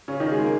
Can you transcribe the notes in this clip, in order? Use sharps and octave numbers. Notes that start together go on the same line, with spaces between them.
C#3 C#4
D#3 D#4
G#3 G#4
A#3 A#4